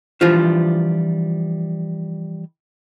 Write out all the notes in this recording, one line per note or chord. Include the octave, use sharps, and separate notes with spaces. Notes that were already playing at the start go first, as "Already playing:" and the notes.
E3 F3 G3 D4 F4 C5